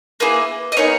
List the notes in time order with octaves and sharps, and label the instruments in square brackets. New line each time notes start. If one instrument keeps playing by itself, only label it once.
[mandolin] A#3 E4 G#4 B4
D#5
B3 D#4 G#4 A#4 C#5